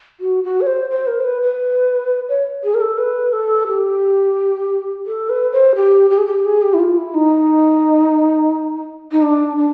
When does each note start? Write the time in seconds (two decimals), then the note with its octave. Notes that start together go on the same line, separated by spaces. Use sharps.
0.20 F#4
0.44 F#4
0.61 C#5
0.67 C5
0.90 C5
1.07 A#4
1.20 C5
1.25 B4
1.42 B4
2.29 C#5
2.64 G#4
2.75 A#4
2.81 A4
2.98 B4
3.33 A4
3.68 G4
5.06 A4
5.29 B4
5.52 C5
5.75 G4
6.10 G4
6.18 G#4
6.26 G4
6.45 G#4
6.62 G4
6.74 E4
6.79 F4
6.97 E4
7.14 D#4
9.12 D#4
9.22 D4
9.57 D4